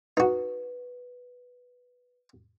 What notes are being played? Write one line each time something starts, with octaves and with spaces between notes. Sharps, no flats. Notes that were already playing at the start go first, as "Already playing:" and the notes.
D#4 F#4 B4